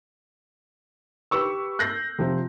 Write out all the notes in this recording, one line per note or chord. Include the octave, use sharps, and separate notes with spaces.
G4 B4 C#6 E6
F#6 G6 A#6 C7
C3 F3